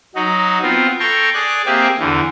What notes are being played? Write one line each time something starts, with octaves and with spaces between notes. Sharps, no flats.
F#3 D#4 F#4
B3 C4 F4
A4 G5 A#5 C6 C#6
G#4 D5 F#6
A#3 C4 G4 G#4 E5
E2 D3 E3